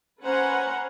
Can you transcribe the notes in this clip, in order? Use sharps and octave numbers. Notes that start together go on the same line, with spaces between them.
C#4 B4 C5 F#5 G#5 A#5